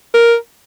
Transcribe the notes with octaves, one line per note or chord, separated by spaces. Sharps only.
A#4